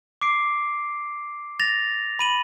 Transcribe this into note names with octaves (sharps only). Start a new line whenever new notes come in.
D6 C7 D7
A6 A#6 F7
B5 D#7 F#7